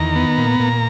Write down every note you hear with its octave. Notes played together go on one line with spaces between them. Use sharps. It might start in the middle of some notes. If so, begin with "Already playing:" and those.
Already playing: E2 D#3 A#5
B3
A#2
A#2